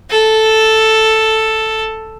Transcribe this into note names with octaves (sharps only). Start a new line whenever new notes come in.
A4